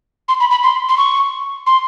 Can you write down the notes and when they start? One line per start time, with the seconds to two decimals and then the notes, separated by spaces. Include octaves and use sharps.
0.29 C6
0.40 B5
0.51 B5
0.63 C6
0.89 C6
0.98 C#6
1.67 C6